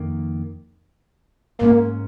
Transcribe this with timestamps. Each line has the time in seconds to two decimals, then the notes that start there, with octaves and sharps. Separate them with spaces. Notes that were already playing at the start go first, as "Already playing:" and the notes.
Already playing: F2 D#3 A#3
1.61 G#2 G#3 A#3 C#4